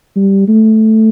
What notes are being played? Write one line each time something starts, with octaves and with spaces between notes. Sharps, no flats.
G3
A3